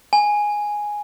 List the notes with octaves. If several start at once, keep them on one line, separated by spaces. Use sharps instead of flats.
G#5